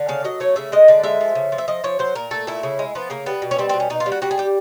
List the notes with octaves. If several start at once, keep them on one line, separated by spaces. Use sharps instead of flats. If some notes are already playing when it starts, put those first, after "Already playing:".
Already playing: D3
C#3 F5
F#3 D#5
A3 C#5
C#3 E5
G#3 D#5
D3 D5
G#3 E5
F3
C#3
F3
E5
F3 D#5
F3 C#5
F#3 C5
A#2 A#4
A3 A4
A#2 E4
C#3
G#3
F3 B3
C#3 A#3
G3 B3
B2
C#4
G3 C4
B2 C4
C#4
B2 D#4
F4
G3
F#4
G3 F#4
G#4
G3 G4